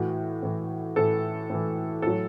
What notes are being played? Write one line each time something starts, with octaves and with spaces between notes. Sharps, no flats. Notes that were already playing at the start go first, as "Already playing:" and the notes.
Already playing: A2 E3 F#4
A2 E3
A2 E3 A4
A2 E3
A2 F#3 A4